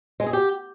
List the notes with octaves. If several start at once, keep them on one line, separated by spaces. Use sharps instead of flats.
G#3
G#4
G4